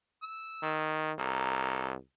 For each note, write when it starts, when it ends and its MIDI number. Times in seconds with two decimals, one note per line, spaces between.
0.23 0.83 88
0.63 1.12 51
1.19 1.95 36
1.19 1.88 69
1.19 1.88 70